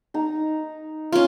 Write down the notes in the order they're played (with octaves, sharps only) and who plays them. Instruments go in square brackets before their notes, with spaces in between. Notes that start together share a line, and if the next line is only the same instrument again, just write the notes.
[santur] D#4 A#5
[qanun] C#4 F4